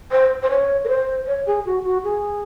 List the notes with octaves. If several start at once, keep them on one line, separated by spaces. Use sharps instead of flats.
C5
C5
C#5
A#4
C5
C#5
G#4
F#4
F#4
G#4